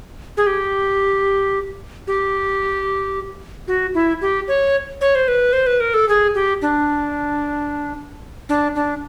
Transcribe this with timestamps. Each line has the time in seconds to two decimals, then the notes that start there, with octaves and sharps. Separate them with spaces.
0.37 G#4
0.47 G4
2.07 G4
3.68 F#4
3.94 E4
4.21 G4
4.48 C#5
5.01 C#5
5.15 C5
5.28 B4
5.53 C5
5.67 B4
5.80 A#4
5.94 A4
6.09 G#4
6.35 G4
6.62 D4
8.49 D4
8.75 D4